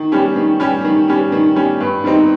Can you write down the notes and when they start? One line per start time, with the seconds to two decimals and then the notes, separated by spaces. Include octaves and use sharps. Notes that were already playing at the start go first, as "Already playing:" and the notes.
Already playing: D#3
0.12 G3 C#4 G4
0.36 D#3
0.60 G3 C#4 G4
0.85 D#3
1.08 G3 C#4 G4
1.32 D#3
1.56 G3 C#4 G4
1.80 G2
2.04 D#3 G3 C4 D#4